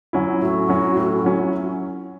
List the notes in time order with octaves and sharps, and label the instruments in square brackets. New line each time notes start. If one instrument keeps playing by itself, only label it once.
[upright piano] F#3 C#4 E4
[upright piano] A2 [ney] F#4
[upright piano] F#3 C#4 E4
A2
F#3 C#4 E4